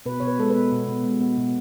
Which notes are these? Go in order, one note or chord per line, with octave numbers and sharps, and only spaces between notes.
B2 B4
B2 C#5
B4
G#3 A4
B4
B3
B2
B2
G#3
B3
B2